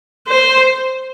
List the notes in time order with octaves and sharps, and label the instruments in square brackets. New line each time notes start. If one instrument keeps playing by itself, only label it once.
[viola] C5